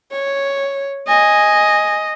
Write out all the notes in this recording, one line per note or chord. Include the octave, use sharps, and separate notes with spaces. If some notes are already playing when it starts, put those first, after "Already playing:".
C#5
D#5 G#5